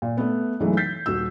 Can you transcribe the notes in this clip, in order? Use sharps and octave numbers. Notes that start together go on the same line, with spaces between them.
A#2
A3 B3
B1 F#2 E3 F#3 G#3 A3
G6 A6 B6 C7
D#1 F#4 E6